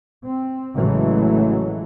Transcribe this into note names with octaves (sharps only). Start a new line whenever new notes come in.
C4
A1 C#3 E3 F#3 G#3 A3